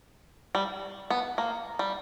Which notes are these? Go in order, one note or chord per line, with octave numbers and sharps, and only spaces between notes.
G3
B3
A#3
G3